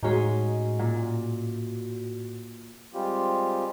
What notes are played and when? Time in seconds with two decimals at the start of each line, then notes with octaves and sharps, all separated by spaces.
0.03 A2 G#3 C#4 D#4 F#4
0.79 A#2
2.94 G3 G#3 C4 F4 G4